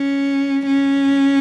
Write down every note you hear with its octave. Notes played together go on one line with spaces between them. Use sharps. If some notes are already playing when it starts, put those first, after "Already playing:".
Already playing: C#4
C#4